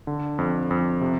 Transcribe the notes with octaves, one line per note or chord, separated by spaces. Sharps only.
D3
F2
F2
C3